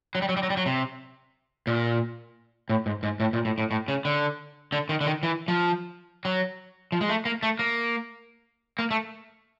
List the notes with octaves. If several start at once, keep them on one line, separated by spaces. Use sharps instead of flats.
F#3
G3
F#3
G3
F#3
G3
F#3
C3
A#2
A2
G#2
G#2
A2
A#2
A2
A2
A2
C#3
D3
D3
D#3
D3
D#3
E3
F3
F#3
F3
G#3
A3
A#3
A3
A#3
A#3
A3